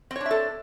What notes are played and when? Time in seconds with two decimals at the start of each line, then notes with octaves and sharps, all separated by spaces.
0.11 C4
0.16 C#5
0.21 D4
0.26 E5
0.31 A4